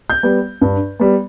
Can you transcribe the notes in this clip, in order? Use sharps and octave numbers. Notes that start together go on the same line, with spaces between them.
G6
G3 B3
G2
G3 B3